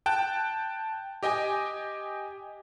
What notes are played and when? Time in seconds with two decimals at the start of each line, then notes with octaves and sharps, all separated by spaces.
0.06 G5 A5 F#6
1.23 G4 D#5 G5 G#5